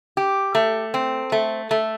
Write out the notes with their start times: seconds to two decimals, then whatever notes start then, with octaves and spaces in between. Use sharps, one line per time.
0.17 G4
0.55 A3
0.94 C4
1.32 A3
1.71 A3